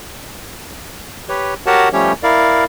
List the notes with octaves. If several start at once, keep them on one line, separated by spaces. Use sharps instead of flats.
G4 B4 C#5
F#4 G4 A#4 C#5 F#5 A5
F3 G3 A3 C#4 G4 C#5
E4 A#4 D5 F5